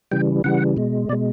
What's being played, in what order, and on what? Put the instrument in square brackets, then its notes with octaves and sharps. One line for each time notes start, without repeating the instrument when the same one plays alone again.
[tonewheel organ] C#3 E3 G3 G5
C#3 E3 G3 F#5
B2 G#3
B2 D5
G#3